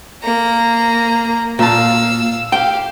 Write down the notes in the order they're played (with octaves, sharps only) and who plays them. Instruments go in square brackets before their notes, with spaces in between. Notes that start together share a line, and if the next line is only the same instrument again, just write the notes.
[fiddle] A#3 A#5
[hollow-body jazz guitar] A#2 A5 [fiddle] F5 E6
[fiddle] G4 F5 [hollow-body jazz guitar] G5